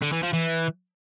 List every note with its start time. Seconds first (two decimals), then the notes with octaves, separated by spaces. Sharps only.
0.02 D3
0.12 E3
0.23 F3
0.33 E3